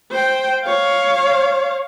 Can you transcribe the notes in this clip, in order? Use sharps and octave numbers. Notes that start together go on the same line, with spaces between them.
C5 G5
C#5 F5